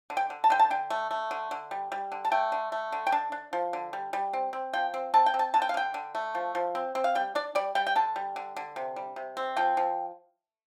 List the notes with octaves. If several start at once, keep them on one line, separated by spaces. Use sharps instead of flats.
D3
G5
D3
A5
D3 G5
A5
D3 G5
A3
A3
D3
D3
G3
G3
D3
A5
A3 G5
D3
A3
D3
G5
D4 A5
D4
F3
D3
G3
G3
C4
C4
F3 G5
C4
C4 A5
G5
C4
A5
D3 A5
G5
F5
D3 G5
D3
A3
F3
F3
C4
C4
F5
G3 G5
D4 D5
G3 D5
G3 G5
G5
D3 A5
G3
D3
D3
C3
G3
C3
C4
F3 G5
F3